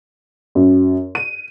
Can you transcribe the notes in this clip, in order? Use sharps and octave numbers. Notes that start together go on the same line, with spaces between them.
F#2
D#7